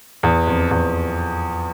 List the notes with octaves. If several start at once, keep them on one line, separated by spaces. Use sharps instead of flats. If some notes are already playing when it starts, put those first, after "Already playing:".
E2
F2
E2